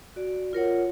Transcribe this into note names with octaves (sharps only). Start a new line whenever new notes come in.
F#4 D5
F4 A#4 C#5 F#5